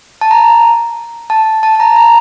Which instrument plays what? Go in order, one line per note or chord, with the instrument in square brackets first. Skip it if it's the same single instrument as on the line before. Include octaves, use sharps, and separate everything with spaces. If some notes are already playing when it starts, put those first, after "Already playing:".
[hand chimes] A5
A#5
A5
A5
A5
A#5
A#5